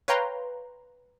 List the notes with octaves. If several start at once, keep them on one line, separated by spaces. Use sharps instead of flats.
B4 C#5 F5 G5 A#5 C6